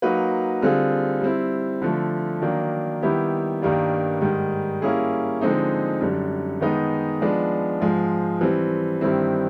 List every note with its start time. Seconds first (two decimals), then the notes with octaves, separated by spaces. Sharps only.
0.02 F#3 A#3 D#4 F#4 B4
0.62 D3 G3 C4 F4 G#4
1.21 G3 C4 E4
1.82 D3 F3 A3
2.42 D#3 F#3 A#3 D4
3.02 D#3 G3 B3 E4 G4
3.62 G2 D#3 G3 A#3 D4
4.21 G#2 D#3 G3
4.82 G3 A#3 C#4 E4 G#4
5.41 D3 F3 G#3 C4 D#4
6.01 F#2 D3 G3
6.60 D#3 G#3 B3 D#4
7.21 F3 G#3 B3 D4
7.80 G#2 F3 G#3
8.41 E3 G3 C4
9.01 G2 D#3 G3 C4 E4